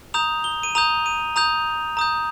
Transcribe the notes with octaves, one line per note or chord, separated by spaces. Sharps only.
A#5 D#6 G6 F7
G7
D#7
A#5 D#6 G6 F7
D#7
A#5 D#6 G6 F7
A#5 D#6 G6